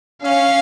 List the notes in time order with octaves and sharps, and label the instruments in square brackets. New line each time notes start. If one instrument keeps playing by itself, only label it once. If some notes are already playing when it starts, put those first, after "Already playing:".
[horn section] C#4 [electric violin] F5